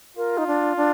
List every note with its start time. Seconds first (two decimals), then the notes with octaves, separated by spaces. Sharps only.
0.17 F4 A#4
0.38 D#4
0.47 D4
0.77 D4